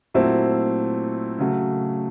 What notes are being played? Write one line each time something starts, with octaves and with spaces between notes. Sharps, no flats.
A#2 F#3 A3 C4 E4
C#3 F#3 A3